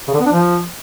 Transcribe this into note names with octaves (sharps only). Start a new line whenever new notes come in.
C#3
D3
B3
D4
F3